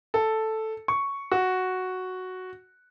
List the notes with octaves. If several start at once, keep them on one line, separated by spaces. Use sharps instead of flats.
A4
C#6
F#4